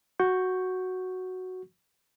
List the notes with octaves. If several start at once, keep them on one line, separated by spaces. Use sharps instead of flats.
F#4 C#6 G6